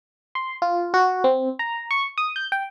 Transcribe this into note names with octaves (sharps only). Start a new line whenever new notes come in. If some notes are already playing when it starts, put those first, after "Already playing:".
C6
F4
F#4
C4
A#5
C#6
D#6
G6
G5